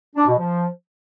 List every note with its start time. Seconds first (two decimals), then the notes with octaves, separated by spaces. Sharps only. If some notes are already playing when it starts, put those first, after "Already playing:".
0.16 D4
0.27 B2
0.38 F3